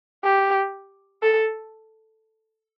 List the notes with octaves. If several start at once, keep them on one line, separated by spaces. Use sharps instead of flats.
G4
A4